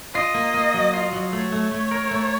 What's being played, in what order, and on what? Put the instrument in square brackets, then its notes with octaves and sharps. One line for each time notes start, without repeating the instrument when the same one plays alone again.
[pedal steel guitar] F4 [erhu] D#5
[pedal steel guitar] A#3
A#3
F#3
F4
F#3
[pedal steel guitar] A3 [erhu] C#5
[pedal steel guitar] A3
A3
A#4
A3